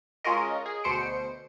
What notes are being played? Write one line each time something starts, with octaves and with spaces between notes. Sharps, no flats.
G#3 C#4 F4 F#4 A#4 D#5
G#4
D2 B2 C5 C#7 D7